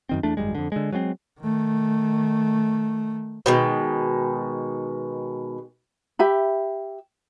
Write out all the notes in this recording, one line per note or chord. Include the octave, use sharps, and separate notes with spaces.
F#2 D#3 C4
E2 A3 D4
G#1 F#2 G3 G#3
F2 D3
D3 G#3
F#3 G#3 A3 C4
D#3 A3
B2 D#3 G#3
G4 E5 B5